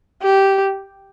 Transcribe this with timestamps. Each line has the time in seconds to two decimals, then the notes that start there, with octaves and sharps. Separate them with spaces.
0.22 G4